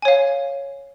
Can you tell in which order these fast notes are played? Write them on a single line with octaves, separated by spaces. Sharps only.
G#5 C#5 F5